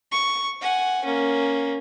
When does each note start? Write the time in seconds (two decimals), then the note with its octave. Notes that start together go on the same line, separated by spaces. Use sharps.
0.12 C#6
0.61 F#5 G#5
1.04 A#3 C#4